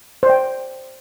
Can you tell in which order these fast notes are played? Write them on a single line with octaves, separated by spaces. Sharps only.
C5 D5 G5